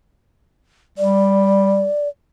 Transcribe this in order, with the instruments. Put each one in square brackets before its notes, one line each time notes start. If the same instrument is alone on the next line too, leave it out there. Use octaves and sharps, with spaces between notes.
[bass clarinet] G3 [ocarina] D5